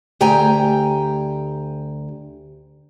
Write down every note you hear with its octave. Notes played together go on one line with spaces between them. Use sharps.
D2 G4 G5 G#5 A#5